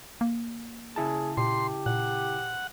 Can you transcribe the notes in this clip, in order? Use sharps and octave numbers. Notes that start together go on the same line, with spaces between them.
A#3
C#3 E4 G#4 A5
A#2 G4 C6
A#2 F#5